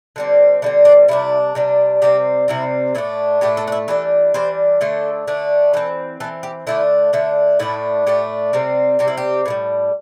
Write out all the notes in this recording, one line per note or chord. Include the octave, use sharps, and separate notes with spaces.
D3 G3 C4
D3 G3 C4 E4
D4
C3 G3 D4 E4
C3 G3 D4
C3 G3 C4 G4
C3 G3 C4 E4
A2 A3 D4 E4
A2 A3 D4 G4
A4
D4
E4
E3 G3 D4 A4
E3 G3 D4 C5
D3 A3 D4 A4
D3 A3 D4
E3 C4 A4
E3 C4 A4
G4
D3 A3 D4 E4
D3 A3 D4 E4
A2 A3 D4 E4
A2 A3 D4 G4
C3 G3 C4
C3 G3 C4 G4
E4
G4
A2 E3 G3